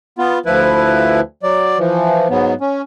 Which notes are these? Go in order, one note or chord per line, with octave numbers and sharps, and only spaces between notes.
B3 F4
D2 F3 E4 B4
F#3 D5
E3 F3
G#2 F#3 B3
C#4